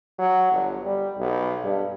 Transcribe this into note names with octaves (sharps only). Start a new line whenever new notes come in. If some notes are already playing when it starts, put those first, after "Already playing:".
F#3
G1
G3
B1
G2